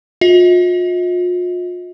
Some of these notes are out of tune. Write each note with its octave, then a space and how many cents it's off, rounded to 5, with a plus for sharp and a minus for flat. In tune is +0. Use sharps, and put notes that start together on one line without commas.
F4 +40 D#5 +45